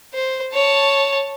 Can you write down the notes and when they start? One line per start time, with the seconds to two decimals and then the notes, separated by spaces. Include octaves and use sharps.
0.14 C5
0.54 C#5 A5